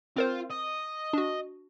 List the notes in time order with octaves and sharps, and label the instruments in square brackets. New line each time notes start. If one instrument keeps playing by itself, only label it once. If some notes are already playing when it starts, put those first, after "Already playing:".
[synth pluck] C4 A#4 C5 [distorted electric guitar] F4
[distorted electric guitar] D#5
[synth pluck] D4 F#4